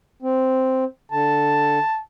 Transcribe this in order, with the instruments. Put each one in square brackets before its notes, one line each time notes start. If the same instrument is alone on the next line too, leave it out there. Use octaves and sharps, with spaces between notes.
[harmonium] C4
[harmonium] D3 [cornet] A5